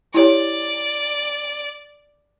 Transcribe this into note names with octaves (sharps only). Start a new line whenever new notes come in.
E4 G4 C#5 D5